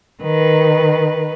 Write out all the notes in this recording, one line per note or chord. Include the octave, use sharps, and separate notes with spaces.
D#3 B4